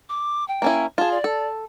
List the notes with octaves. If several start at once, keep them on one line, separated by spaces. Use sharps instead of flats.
D6
G5
A#3 C#4 E4
F4 G#4 A5
D5
A4